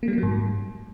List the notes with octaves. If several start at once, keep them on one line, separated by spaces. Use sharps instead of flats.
A#3
G3
A#3
F#3
G#2